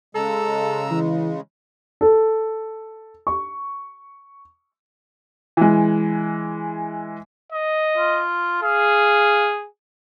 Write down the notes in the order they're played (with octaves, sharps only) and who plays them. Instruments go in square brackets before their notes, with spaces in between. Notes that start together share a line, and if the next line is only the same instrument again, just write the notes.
[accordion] C#3 G#3 [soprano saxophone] A4 [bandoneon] A#5 E6
[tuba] E3
[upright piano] A4
C#6
[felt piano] E3 G#3
[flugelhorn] D#5
[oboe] F4
[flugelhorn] G#4 [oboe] F5